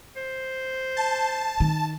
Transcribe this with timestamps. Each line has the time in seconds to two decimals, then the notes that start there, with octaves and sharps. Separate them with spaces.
0.17 C5
0.97 A5
1.60 D#3